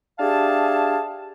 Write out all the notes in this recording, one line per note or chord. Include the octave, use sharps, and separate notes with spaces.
D4 G4 G#4 E5 F5 A5